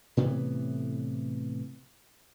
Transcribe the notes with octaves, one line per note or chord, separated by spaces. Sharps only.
A2 C3 E3 B3